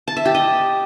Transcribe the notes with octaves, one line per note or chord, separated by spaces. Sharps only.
A5
E5
G4
D#5